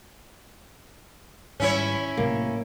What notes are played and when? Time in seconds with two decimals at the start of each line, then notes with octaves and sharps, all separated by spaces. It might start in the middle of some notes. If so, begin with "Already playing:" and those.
1.60 G#2 D#3 G3 C#4 E4 C#5
2.17 A2 C3 F#3 A#3